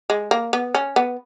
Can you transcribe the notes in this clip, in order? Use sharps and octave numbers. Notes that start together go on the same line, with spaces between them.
G#3
A#3
B3
C#4
B3